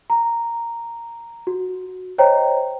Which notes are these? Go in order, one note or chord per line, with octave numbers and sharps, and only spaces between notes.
A#5
F#4
C5 C#5 D#5 G5 A#5